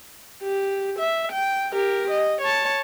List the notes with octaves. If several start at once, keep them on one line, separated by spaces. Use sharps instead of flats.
G4
E5
G5
G4 A#4
D#5
C#5 A5